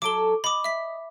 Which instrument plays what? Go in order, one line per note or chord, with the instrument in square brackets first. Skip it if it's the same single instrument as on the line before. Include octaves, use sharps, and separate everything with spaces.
[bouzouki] F#3 A4 [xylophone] D6 D7 G7
[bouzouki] D#5 [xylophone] B5 D6
[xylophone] E5 B6